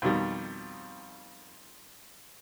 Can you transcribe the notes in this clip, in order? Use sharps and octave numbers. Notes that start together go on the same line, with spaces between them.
F2 B2 D#3 G3